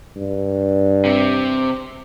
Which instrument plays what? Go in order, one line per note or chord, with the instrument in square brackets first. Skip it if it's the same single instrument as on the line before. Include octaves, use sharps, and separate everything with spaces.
[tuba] G2
[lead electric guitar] C3 C4